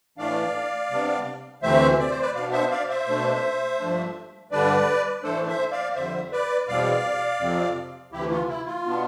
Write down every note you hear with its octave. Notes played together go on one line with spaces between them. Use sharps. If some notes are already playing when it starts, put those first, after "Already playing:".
A2 E3 A3 D4 D5 F5
C3 G3 B3 D4
D2 C3 E3 A3 C4 C5 E5
D5
C5
B4 D5
B2 B3 D4 D5 F5
C5 E5
D5 F5
C5 E5
B2 A3 D4
G2 F3 A3 D4
G2 D3 G3 D4 B4 D5
A2 E3 A3 D4 A4 C5
C5 E5
D5 F5
F2 D3 G3 C5 E5
B4 D5
E2 B2 G3 C4 D5 F5
F2 C3 F3 C4
D2 C3 E3 A3 E4 G4
F4
E4
F4
B2 B3 D4